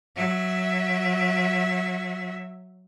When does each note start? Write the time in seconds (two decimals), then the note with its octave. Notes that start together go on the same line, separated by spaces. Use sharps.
0.17 F#3 E5